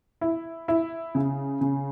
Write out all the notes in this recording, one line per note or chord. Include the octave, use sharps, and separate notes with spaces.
E4
E4
C#3
C#3